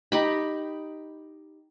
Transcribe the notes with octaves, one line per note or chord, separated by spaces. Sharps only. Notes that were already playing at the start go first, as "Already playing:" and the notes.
D#4 G4 B5